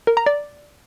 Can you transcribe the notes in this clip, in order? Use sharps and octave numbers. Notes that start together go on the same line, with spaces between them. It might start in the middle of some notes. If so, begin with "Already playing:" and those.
A#4
A#5
D5